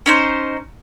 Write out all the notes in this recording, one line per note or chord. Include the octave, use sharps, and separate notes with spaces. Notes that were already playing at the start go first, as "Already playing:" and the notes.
C#4 D#4 C5